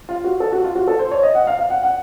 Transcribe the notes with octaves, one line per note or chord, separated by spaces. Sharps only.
F4
F#4
A4
F#4
F4
F#4
A4
C5
C#5
D#5
F#5
F5
F5
F#5
F#5